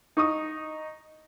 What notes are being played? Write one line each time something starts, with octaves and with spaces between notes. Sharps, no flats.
D#4 C#6 D#6